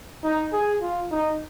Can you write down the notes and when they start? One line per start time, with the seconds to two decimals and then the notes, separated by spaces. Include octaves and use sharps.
0.24 D#4
0.53 G#4
0.81 F4
1.11 D#4